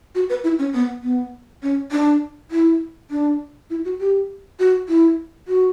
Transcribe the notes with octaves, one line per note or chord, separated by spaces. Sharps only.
F#4
B4
E4
C#4
B3
B3
C#4
D4
E4
D4
E4
F#4
G4
F#4
E4
F#4